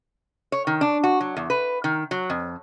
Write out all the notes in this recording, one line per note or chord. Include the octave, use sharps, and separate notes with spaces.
C#5
D#3
D4
F#4
F#3
E2
B4
D#3
F#3
F2